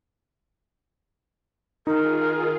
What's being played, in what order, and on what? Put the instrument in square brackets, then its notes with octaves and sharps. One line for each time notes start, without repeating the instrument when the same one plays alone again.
[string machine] D#3 F4 G#4 [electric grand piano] D#4 [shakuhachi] A#4